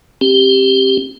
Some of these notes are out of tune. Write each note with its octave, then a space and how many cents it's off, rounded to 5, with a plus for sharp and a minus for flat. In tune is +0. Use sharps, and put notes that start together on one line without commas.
C4 +30 G4 +0